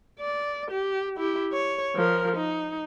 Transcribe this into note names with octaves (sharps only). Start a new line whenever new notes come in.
D5
G4
E4 G4
C#5
F3 A#4
D#4